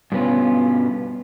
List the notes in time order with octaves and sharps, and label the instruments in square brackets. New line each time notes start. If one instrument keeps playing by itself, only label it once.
[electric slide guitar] G2 B2 B3 C#4 F4